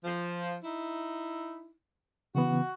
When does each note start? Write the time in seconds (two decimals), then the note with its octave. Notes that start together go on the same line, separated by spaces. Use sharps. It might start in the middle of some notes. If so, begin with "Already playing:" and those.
0.04 F3
0.63 D#4 E4
2.35 C#3 E3 B3 F#4